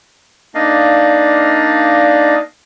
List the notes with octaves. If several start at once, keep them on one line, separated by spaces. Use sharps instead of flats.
A#3 D4 D#4 D5 D#5 F5